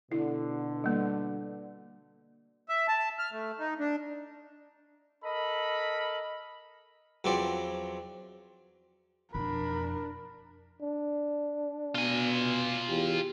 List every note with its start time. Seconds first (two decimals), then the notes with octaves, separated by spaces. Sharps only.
0.12 B2 D3 E4
0.84 G3 A#3
2.69 E5
2.88 A5
3.19 F6
3.32 A3
3.59 D#4
3.79 D4
5.24 A4 A#4 D#5 B5
7.24 E2 F3 F#3 C4 D5
9.34 F2 B2 D4 A#4 B5
10.82 D4
11.95 B2 F4 G#5
12.89 E2 G4